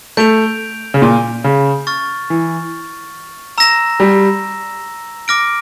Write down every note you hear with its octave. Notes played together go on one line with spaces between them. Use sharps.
A3 G6 D7 F7
C#3
A#2
C#3
C#6 F6 A6
E3
A#5 E6 A#6 E7
G3
D6 F6 A#6 D7